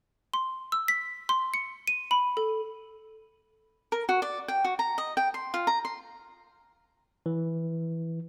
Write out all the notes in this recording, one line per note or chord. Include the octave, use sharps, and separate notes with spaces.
C6
E6
B6
C6
C#7
D#7
B5
A4
A#4
F#4
D5
G5
F#4
A#5
D#5
G5
C6
F4
A#5
C6
E3